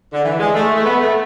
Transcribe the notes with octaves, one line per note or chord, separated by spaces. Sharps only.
D3
E3
G#3
A3
A3
B3
A3